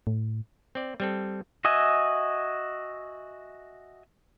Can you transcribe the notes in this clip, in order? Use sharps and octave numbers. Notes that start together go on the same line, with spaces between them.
A2
C4 D5
G3 C4 A4
F#4 D#5 E5 G#5